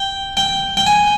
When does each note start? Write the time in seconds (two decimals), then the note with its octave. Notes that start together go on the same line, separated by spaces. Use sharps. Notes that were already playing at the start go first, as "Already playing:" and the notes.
Already playing: G5
0.37 G5
0.77 G5
0.87 G#5